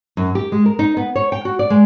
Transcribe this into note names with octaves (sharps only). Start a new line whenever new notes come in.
F#2
G4
G#3
A#4
D#4
B3
C#5
G5
F#4
D5
G#3